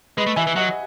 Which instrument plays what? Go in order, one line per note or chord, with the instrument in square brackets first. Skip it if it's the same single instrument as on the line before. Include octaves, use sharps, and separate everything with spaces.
[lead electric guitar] G#3 [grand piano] B4 D#5
[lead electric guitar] A3
[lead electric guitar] E3 [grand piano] E5 G#5
[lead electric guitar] E3
[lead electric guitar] F#3 [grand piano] D#5 F#5